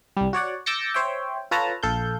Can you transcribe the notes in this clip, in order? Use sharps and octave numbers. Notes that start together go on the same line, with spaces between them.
C2 G3
F#4 C#5 D5 F#5
D6 E6 G6 A6 A#6 C#7
C5 C#5 E5 G5
F4 A4 B4 C#5 A5 A#5
A#1 A4 F5 G6